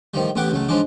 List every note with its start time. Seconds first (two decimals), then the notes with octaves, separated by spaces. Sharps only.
0.14 A2 D#3 F3 G3
0.36 A1 A2 B3 G4 F#5 D6
0.51 C#2 F#3 A3
0.69 G#2 F3 F#3 G#3 D4